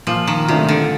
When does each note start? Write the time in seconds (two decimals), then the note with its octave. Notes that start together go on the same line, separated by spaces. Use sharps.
0.07 A#2 F3
0.27 D#3
0.48 C3 A3 D4 F4
0.69 D3